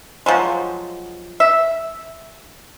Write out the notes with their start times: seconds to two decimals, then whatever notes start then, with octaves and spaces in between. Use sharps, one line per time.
0.26 F3 F#3 G#3
1.40 E5